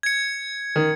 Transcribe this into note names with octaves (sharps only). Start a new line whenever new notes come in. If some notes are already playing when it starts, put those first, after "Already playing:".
G#6 C#7
D#3